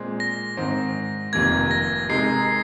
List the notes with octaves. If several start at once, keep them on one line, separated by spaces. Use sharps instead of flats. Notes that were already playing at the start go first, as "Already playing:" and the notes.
Already playing: A#2 G#3 C4
A#6
G#2 D#3 C4
F1 F2 C3 D#3 A#3 G#6
A#6
C3 G#3 D#4 A#4 C7